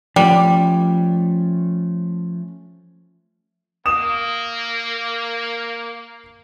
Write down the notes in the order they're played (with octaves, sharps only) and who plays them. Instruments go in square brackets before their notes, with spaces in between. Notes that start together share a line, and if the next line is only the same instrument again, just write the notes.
[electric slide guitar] F3 A3 C#4 [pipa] G3
[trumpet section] A#3 [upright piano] D#6 E7